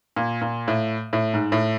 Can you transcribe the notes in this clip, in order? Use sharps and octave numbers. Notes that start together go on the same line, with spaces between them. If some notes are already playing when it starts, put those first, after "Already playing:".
A#2
A#2
A2
A2
G#2
A2